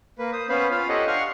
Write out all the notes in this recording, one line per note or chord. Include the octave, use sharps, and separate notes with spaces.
A#3 B4
C5 D#6
B3 C#4 B4 C5 F5 B5
F4 F5 B5
G4 A4 C5 C#5 D#5 F#5
D4 F5 F#5 C6 C#6 F6